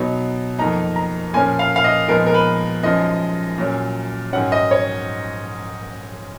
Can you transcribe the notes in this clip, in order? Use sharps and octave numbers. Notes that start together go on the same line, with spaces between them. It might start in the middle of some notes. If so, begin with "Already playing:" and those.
Already playing: B2 F#3 B3 D#4
F2 D#3 A#3 D#4 A#5
A#5
A#2 F3 A#3 C#4 G#5
F5
F5
D#5
A#2 F3 G#3 B3 D#4 A#4
A#4
B4
F#2 F3 G#3 D#4 D#5
A#2 F#3 C#4
G#2 D#3 F#3 C#4 F#5
D#5
C#5